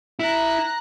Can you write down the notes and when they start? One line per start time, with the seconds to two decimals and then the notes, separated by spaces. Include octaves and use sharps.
0.19 E4 A#5 F#6